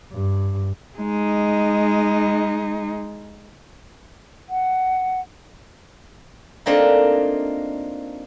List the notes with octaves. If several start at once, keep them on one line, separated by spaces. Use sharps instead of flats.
G2
G#3 D#4
F#5
A3 A#3 C4 D4 D#4 F4